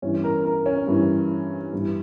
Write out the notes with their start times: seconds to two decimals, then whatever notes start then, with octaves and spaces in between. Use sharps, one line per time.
0.02 G2 E3 C#4
0.24 A#4
0.45 A#4
0.66 C#4
0.88 G2 E3
1.73 G2 E3